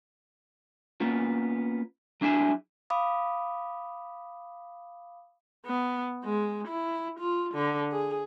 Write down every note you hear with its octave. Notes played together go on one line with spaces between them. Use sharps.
A#3 B3 C#4 F4
F#3 D4 E4 G#4 E5
F5 B5 D6 D#6
B3
G#3
E4
F4
D3
G#4